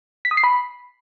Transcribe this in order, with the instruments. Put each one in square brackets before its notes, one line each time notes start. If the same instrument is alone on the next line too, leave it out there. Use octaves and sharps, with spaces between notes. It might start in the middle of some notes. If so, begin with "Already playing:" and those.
[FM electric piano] B6
D#6
C7
B5